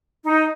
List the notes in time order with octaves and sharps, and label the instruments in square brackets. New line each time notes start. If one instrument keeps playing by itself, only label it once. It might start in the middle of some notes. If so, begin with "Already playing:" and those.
[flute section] D#4